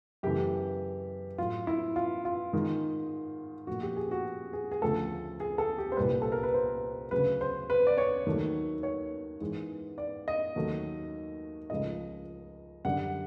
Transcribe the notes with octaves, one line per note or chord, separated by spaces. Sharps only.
F#2 C#3 E3 A3 G4
A2 F#3 A3 F4
E4
F4
F4
G#2 D#3 G#3
A#2 F3 A3 F#4
G4
G#4
F#4
G#4
G#4
D2 C#3 F3 A3 A4
G#4
A4
G4
C5
C2 A#2 G3 B4
A4
A#4
B4
C5
D2 C#3 F#3 B4
C5
B4
D5
C#5
D#2 D#3 F#3 A3
C#5
G#2 E3 G#3
D5
D#5
D#2 D#3 F#3 A3
C#2 C#3 F3 A3 D#5
F#2 D3 G3 F#5